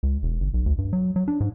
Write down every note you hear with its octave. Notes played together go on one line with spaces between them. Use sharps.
C#2
E1
G1
B1
D2
G2
F#3
F#3
D4
G#2